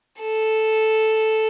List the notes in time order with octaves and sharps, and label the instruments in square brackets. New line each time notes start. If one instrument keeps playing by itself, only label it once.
[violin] A4